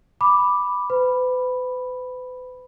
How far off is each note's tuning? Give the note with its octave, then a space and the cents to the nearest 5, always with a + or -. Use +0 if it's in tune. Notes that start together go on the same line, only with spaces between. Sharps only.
B5 +0 D6 +0
B4 +40 B5 +0